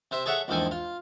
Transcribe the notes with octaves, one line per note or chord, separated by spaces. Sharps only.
C3 C5 E5
G#4 A4 C#5 E5 F#5
A#1 E2 G#2 A4 G5 G#5
F4